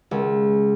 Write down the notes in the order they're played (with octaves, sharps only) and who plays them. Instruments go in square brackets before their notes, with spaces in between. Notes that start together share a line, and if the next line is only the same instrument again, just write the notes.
[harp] C#2